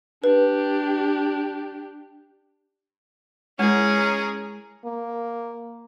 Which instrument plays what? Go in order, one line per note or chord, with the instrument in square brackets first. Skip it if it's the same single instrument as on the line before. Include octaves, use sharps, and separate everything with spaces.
[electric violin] D4 G4 [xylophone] B4
[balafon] G#3 E4 [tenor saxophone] C#4 [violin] G#4 A#4
[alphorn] A#3